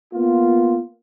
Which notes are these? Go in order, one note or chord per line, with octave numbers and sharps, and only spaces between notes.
A#3 B3 F4